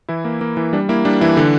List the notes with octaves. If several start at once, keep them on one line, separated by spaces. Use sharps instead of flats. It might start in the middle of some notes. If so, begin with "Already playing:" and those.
E3 E4
A#3
A#3
E3
G3 D4
A#3 E4
G3 D4
E3 E4
D3 D4